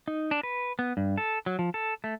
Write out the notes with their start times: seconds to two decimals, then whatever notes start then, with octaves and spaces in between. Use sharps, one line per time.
0.08 D#4
0.31 D4
0.43 B4
0.79 B3
0.97 G2
1.18 A4
1.46 F#3
1.59 F3
1.74 A4
2.04 A3